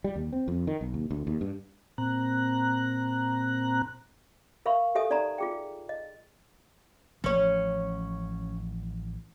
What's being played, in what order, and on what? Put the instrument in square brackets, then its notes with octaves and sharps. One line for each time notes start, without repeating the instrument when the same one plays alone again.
[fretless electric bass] G3
D#2
C4
F2
D#3
B1
D#2
D2
D#2
G2
[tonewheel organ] A#2 C4 A#5 F#6
[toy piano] A#4 E5 F5 B5 C#6
G4 A4 E5 G#5 D#6
D#4 D5 E5 G#5 A#5 B5
F4 G#4 G5
D#5
[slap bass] A1 F3 A3 [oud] C#4 C#5